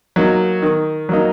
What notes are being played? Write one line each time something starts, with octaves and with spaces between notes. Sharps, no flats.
F#3 A#3 D#4
D#3
F#3 A#3 D#4